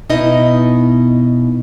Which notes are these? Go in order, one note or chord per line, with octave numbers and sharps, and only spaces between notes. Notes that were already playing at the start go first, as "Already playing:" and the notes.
B2 D#4 E4 D#5